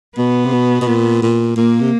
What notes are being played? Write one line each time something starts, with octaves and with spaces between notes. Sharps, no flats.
B2 B3
C3
B2
B2
A#2
A#2
A#2 A#3
C3